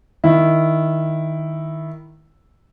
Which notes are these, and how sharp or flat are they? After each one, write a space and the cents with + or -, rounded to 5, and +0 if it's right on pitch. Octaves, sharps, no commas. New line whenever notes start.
D#3 +0 E4 +0